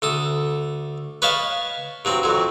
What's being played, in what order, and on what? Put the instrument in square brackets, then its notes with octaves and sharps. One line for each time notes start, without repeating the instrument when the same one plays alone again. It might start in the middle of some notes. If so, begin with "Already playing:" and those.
[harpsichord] D2 A4 D#6
B4 C#5 D#5 F5 A5
G2 F#3 C4
F2 F#3